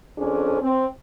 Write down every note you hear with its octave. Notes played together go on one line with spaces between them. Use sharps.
F2 C#4 D4 G#4 A4 C5
C4